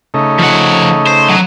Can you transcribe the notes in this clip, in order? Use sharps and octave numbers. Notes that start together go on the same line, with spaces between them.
C#3 A3 D#4
F3 F#5
C5
F#3